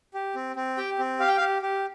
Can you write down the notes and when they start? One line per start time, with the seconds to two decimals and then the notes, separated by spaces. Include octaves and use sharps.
0.14 G4
0.35 C4
0.56 C4
0.77 G4 G5
0.99 C4
1.19 G4 F5
1.28 G5
1.37 F5
1.40 G4
1.62 G4